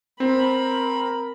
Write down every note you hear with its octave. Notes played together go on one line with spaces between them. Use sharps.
C4 A#4 B5